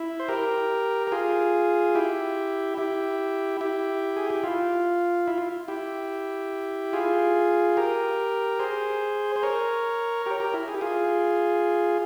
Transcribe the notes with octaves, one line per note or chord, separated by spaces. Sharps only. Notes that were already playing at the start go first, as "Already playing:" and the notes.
Already playing: E4
C5
G4 A#4
A#4
F4 G#4
E4 G4
E4 G4
E4 G4
G#4
G4
F4
E4
F4
E4 G4
F4 G#4
G4 A#4
G#4 C5
C5
A#4 C#5
G4 A#4
G4 A#4
E4
G#4
G4
F4 G#4